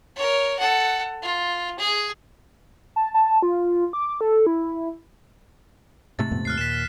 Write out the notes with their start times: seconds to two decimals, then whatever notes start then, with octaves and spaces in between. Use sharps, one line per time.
0.16 A#4 C#5
0.59 A4 F#5
1.22 F4
1.79 G#4
2.96 A5
3.14 A5
3.42 F4
3.93 D6
4.21 A4
4.47 E4
6.19 G#2 C3 A3 A6
6.31 F2 A#2 B3
6.45 D#2 F6 F#6 C7
6.58 A#2 B6 E7